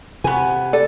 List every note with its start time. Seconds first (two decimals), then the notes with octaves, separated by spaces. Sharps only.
0.24 C3 B3 G#5
0.73 A4 D5